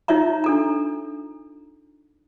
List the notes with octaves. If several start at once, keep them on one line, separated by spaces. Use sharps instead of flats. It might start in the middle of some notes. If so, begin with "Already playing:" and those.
D#4 F4 C#5 E5 A#5
D4 A4 A#5